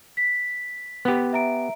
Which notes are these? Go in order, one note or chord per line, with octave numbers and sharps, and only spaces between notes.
B6
B3 G4
E5 A#5 D7